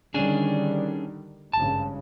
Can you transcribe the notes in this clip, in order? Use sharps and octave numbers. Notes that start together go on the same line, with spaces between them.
D3 D#3 G3 C#4 D4 G#4
G#1 G2 C#3 A5